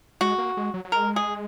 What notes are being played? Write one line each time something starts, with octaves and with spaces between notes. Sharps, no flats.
G#3 F#4
A#3
G#3
F#3
F#3
G#3 A#4
G#4